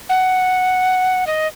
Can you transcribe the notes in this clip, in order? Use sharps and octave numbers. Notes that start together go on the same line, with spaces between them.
F#5
D#5